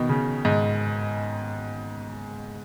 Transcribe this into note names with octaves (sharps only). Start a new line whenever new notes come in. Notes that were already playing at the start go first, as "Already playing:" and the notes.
Already playing: B2 D#3
C#3
G#2